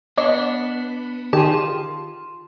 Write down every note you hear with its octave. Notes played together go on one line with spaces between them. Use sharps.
B3 D4 C#5 D#5 D6
D#3 F4 G4 G#4 A5